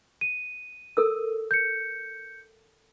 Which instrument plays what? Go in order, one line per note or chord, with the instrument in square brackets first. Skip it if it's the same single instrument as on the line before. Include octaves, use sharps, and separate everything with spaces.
[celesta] D#7
[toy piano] A4 A#4 E6
[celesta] G6 C#7